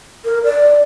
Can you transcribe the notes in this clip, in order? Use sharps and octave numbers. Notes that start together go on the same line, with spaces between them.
A#4
D5